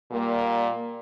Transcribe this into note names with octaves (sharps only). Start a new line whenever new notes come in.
A#2 G3 A#3